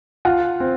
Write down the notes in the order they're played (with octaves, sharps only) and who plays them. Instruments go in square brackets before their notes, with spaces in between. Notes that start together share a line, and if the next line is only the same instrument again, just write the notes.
[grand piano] F4 F#5
C4